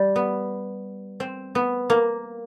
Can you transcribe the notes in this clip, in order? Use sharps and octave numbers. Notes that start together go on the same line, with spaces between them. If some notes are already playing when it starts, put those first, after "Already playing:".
Already playing: G3
B3
C4
B3
A#3